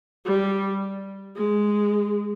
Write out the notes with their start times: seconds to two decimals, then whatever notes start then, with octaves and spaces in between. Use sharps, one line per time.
0.25 G3
1.36 G#3